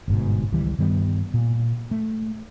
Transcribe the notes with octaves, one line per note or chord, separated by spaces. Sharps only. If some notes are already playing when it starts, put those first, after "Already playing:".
G1 G#2 B2
C#2 D#3 E3 G3
G2 D#3 G3 B3
A#2
A3